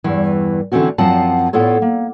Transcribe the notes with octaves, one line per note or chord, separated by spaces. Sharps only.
E2 G2 E3
D3 E3 A3 C4 C#4 F#4
F#2 F3 C4 F4 F#5 A5
A2 B3 E4 F4 A4 C#5
A#3